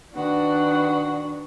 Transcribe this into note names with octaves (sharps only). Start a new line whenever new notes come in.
D#3 D4 F#4 B4 F#5